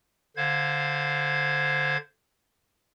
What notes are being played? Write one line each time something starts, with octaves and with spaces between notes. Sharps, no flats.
D3 C5 F5 G#6